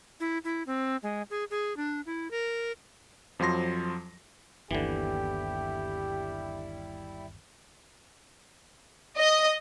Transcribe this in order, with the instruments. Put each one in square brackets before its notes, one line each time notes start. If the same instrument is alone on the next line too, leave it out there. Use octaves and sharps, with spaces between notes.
[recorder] E4
E4
C4
G#3
G#4
G#4
D4
E4
A#4
[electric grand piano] F2 F3 F#3 C6 A#6
[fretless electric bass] G1 D#2 [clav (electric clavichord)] D3 E3 [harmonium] G3 E4 [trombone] G4
[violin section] D#5